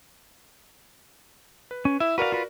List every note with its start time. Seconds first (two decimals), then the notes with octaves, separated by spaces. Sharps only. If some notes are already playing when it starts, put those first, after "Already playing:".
1.71 B4
1.85 C#4
2.00 E4 E5
2.18 F#4 A#4 B4 D5 F5
2.32 F4 B4